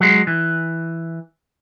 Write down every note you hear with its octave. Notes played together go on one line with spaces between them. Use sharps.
F#3 G#3
E3